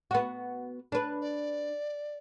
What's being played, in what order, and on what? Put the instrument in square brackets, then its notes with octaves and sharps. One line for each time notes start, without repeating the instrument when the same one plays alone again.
[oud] B3 F#4
D4 B4
[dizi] D5